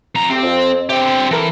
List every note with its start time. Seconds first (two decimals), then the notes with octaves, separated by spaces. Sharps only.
0.15 F2 A#5
0.29 A3 C4 G4
0.43 F2
0.89 D3 C4 G4
1.31 E3 A4 A#4